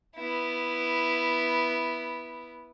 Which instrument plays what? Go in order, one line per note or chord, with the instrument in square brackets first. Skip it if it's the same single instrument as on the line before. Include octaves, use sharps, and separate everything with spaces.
[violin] B3 E4